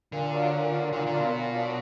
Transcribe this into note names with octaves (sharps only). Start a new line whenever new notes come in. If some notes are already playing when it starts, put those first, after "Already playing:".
A#2 D3
F#3 A#3 D4 F4
A#2
F#3 A#3 D4 F4
A#2 D3
D3
F#3 A#3 D4 F4
B2
A#2
F#3 A#3 D4 F4